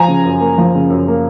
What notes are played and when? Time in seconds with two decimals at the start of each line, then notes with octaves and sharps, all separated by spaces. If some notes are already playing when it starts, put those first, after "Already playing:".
Already playing: F3 G#5 A#5
0.08 C#3
0.25 F#2
0.41 A#3
0.58 F3
0.75 C#3
0.90 F#2
1.08 A#3